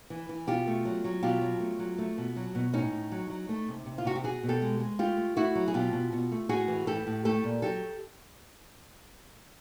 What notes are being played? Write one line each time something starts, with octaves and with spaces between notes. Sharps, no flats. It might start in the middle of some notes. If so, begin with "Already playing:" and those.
E3
E3
B2 F4 G4
A3
F#3
F#3
B2 F4 G4
F#3
A3
F#3
A3
B2
F#3
B2
A2 C#4 D#4
A2
F#3
F#3
A3
C3
C3
F4
C3 F#4
G4
B2 F#4 G#4
B2
G4 A4
G#3
G#3
A3 F4 G4
A3
A3 E4 F#4
F#3
G#4
B2 F4 G4
B2
B2
A3
A2 F#4 G#4
E3
A2 G4 A4
A2
A3 G4 A4
A#2
F#3 G4 A4